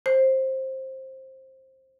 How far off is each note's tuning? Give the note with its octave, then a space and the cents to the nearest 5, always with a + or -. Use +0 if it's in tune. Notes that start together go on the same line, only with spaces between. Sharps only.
C5 +15